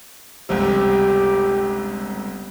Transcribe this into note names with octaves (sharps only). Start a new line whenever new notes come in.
G1 C#2 C3 G4